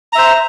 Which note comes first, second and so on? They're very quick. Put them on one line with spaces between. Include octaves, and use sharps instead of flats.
A#5 E5 C5